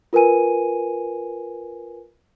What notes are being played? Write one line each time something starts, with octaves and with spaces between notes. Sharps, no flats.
F4 A#4 B4 G#5 D#7